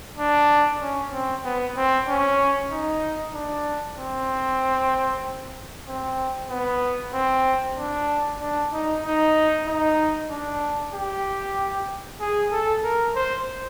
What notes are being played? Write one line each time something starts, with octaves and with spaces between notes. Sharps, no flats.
D4
C#4
C4
B3
C4
C#4
D#4
D4
C4
C4
B3
C4
D4
D4
D#4
D#4
D#4
D4
G4
G#4
A4
A#4
C5